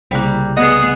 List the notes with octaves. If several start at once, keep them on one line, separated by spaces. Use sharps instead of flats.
C2 C#3 G3 A#3 F#6
B3 G#4 D#5 F#5 D#6